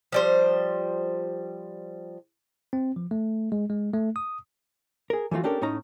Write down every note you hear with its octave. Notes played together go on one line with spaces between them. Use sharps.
F3 G3 C5
C4
F3
A3
G#3
G#3
A3
D#6
G#4 A#4
E3 F3 A3 F4 F#4
C#4 D4 G4 A4 A#4
A2 C#4 D#4 A#5